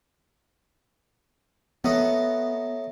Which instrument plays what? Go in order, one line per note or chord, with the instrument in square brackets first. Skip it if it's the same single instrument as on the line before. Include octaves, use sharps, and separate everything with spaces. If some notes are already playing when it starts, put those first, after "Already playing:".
[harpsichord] F#3 A3 D#5 [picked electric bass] B3